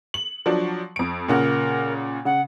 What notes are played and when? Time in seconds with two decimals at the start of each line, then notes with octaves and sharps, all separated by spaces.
0.14 F#7
0.46 F3 F#3 D4
0.96 F2 D7
1.28 A#2 C#3 A#4 F#5
2.25 C#3 F#5